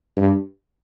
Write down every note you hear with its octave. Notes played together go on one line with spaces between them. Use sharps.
G2